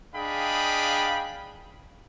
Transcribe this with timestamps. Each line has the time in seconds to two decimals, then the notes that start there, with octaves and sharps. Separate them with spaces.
0.14 D4 G#4 D#5 F5 G5 B5